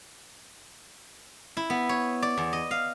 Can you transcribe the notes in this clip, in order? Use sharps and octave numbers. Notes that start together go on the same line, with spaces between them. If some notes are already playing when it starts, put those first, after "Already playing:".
E4
B3
C#5
D5
E2
D#5
F5